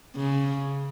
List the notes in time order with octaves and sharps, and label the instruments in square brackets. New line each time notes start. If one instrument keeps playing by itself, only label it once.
[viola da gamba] C#3